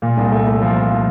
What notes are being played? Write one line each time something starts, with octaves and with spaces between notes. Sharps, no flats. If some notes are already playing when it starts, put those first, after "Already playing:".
A#2
C2
A3
A3
F3
F3
F3